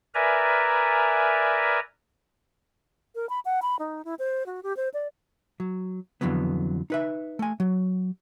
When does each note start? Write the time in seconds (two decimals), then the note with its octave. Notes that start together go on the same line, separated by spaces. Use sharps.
0.15 A#4 B4 D5 E5 G#5 A#5
3.15 A#4
3.29 B5
3.45 F#5
3.62 B5
3.79 D#4
4.05 E4
4.19 C5
4.46 F#4
4.63 G4
4.77 C5
4.94 D5
5.60 F#3
6.21 F2 D3 E3 F#3 B3
6.90 D#4 B4 E5
7.39 A3 G#5
7.60 F#3